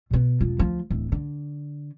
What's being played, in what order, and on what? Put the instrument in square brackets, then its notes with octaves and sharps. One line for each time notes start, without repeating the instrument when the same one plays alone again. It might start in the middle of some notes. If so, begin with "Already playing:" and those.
[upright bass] B2 B3
E1 F3
D2 F3
D1 E3
D3